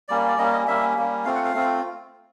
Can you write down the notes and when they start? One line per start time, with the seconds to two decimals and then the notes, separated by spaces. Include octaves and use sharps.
0.08 G3 A#3 C#4 D5
0.28 D5
0.38 G3 A#3 C#4 D#5
0.53 D#5
0.67 G3 A#3 C#4 E5
0.96 G3 A#3 C#4
1.25 A3 C4 F4 F5
1.35 F#5
1.45 F5
1.54 A3 C4 F4